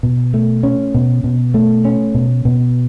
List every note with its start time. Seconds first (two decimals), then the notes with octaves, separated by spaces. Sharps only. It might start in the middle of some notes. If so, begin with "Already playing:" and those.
0.03 B2
0.34 A3
0.63 C#4
0.94 B2
1.24 B2
1.54 A3
1.85 C#4
2.15 B2
2.45 B2